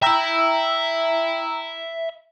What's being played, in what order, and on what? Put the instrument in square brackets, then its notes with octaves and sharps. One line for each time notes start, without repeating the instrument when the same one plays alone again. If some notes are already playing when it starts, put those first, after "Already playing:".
[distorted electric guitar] E5 B5 [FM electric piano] G5 A#5 E6